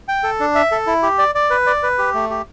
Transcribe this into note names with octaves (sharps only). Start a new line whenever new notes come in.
G5
A4
D4
E5
A4
E4
G4
D5
D5
B4
D5
B4
G4
A3
G4